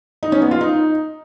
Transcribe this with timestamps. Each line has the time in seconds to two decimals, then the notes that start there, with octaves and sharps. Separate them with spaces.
0.23 D#4
0.32 C#4
0.42 B3
0.51 F4
0.61 D#4